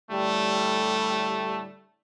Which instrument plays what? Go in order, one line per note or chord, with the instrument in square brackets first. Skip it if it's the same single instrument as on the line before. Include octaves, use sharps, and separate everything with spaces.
[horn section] A2 D3 G3 [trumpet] A3